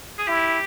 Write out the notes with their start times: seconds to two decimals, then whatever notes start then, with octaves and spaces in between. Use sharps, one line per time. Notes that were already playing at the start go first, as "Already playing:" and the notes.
0.18 G#4
0.27 E4 G4